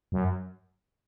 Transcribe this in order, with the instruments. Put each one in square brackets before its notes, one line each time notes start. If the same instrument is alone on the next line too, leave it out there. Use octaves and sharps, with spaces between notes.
[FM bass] F#2